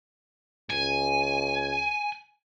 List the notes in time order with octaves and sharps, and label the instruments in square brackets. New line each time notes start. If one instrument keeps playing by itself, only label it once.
[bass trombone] C#2 [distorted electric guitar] G#5